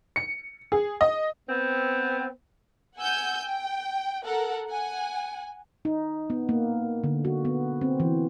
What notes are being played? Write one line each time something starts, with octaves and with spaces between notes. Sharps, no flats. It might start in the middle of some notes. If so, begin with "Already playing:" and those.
C#7
G#4
D#5
B3 C4
F#5 G#5 E6 G6
G5
A4 A#4 F#5
F#5 G#5
D#4
B3
A#3
D3
F#4
B3
C4
E3